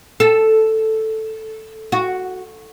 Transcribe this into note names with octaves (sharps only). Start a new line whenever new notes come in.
A4
F#4